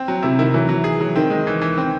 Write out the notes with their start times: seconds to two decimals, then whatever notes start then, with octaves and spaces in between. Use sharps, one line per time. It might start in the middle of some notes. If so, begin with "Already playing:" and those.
Already playing: C4
0.08 F#3
0.22 C3 E4
0.38 D#3 E4
0.54 E3 F#3
0.69 F#3
0.84 G#4
1.01 F#3
1.16 D#3 C4
1.30 G#3
1.47 E3
1.61 E3
1.78 C4